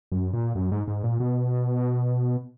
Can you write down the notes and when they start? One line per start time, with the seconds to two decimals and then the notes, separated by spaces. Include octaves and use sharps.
0.12 F#2
0.33 A#2
0.55 F#2
0.72 G#2
0.88 G#2
1.03 A#2
1.20 B2